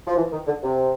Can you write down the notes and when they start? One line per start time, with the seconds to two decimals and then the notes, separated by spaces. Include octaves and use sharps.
0.08 F3
0.17 E3
0.33 D#3
0.47 D3
0.63 C3